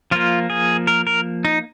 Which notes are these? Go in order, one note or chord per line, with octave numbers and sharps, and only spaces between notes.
F3 A#3 F4
G#4
A#4
A#4
D#4